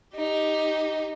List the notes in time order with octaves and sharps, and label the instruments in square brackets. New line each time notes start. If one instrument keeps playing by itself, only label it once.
[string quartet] D#4 G4